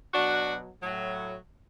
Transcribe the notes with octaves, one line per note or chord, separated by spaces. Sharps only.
B2 F#3 D4 F#4
A2 F#3